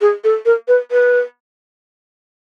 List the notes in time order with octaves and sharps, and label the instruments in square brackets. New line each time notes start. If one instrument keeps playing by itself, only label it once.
[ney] G#4
A4
A#4
B4
B4